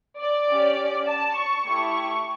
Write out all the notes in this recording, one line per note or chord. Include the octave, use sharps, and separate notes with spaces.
D5
C#4 G4
A5
C#6
A3 E4 G4 C#6